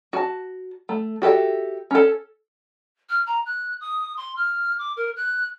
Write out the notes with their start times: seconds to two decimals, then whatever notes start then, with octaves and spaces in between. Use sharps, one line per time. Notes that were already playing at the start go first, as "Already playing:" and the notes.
0.13 F#4 A5
0.89 A3
1.22 F#4 G4 A4 E5
1.91 C#4 A4
3.10 F6
3.27 A#5
3.46 F#6
3.81 D#6
4.17 C6
4.36 F6
4.78 D6
4.97 A#4
5.17 F#6